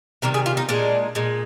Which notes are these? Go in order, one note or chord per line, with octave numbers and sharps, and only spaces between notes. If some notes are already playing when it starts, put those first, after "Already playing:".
C3 D#3 G3 A#4
G#4
F4
D#4
A#2 G#3 D4
A#2 G#3